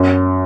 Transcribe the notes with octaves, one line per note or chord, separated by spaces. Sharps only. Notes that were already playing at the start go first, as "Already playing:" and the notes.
Already playing: F#2